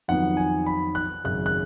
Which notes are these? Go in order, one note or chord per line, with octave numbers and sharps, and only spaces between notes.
F2 D#3 F#3 B3 F#5
G#5
B5
F#6
G#1 F#2 C#3 F#6
F#6